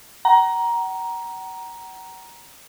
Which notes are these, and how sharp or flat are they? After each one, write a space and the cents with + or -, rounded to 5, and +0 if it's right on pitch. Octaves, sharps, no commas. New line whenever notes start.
F#5 +40 A#5 +15